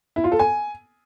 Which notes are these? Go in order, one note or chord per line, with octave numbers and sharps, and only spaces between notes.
E4
F4
A4
G#5